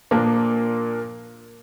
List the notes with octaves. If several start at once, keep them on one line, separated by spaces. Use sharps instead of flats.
A#2 F3 A#3 D4